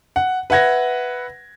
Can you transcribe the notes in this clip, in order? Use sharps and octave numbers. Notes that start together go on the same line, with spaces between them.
F#5
B4 E5 F#5 G#6 A#6